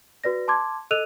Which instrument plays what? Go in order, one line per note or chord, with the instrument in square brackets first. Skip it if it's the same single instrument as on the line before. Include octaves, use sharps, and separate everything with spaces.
[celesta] F#4 B4 D5 A#6
A5 C6 D6 G#6
A4 D#5 E6 F#6 D#7 F7